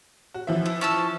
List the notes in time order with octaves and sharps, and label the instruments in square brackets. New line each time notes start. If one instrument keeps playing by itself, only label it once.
[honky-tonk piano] F#4
E3 F3 E5
[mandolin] E4
C#4 A5 E6